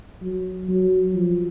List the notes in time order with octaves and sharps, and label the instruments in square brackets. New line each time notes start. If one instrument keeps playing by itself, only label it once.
[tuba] F#3
F#3
F3